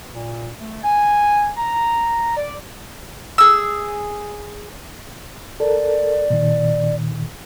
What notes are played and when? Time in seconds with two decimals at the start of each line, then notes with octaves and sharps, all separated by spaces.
0.13 A#2
0.60 A3
0.84 G#5
1.57 A#5
2.37 D5
3.38 G#4 E6
5.60 A4 A#4 D5
6.30 A#2 D#3